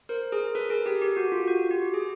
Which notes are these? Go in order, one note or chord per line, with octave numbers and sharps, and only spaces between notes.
A#4 C5
G#4 A#4
A4 B4
G#4 A#4
G4 A4
G4
F#4
F4
F#4
G4
G#4